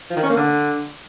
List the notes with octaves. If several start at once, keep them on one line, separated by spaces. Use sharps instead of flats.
F3
D#3
C#4
A#3
D3